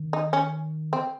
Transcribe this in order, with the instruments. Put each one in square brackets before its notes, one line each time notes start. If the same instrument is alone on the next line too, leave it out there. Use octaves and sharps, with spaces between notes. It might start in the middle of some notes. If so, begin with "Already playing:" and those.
Already playing: [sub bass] D#3
[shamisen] D#4
C#4
C4